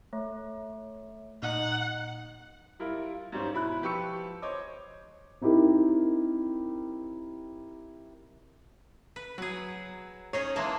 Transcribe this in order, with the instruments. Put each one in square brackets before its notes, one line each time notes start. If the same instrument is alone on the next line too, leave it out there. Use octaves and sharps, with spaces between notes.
[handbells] A3 [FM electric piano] C#5
[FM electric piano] A#2 [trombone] D#4 [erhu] F#5
[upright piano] G3 E4 F4 A#4
F4
G#2 G3 C#4 C5 C#5
B2 E4 B5 F#6
F3 G4 B4 C#6 E6 C#7
C5 C#5 D#5 D6
[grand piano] C4 D#4 E4 G4 A#4
[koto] B4
[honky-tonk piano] F#3 [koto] G#4 B4
[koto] C#4 D#4 G#4 [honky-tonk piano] C#5
[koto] E3 G#3 A#3 [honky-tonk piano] A5 C6